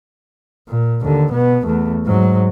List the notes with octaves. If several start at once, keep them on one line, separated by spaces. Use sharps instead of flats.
A#2
D#2 D3
B2 B3
E2 A3
G#2 F#3